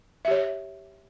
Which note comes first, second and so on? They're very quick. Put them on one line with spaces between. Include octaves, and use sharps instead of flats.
E5 G4 C#5